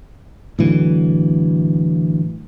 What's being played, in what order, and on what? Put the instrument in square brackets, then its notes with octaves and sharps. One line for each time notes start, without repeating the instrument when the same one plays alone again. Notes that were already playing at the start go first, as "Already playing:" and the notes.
[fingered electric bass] A2 D3 E3 F#3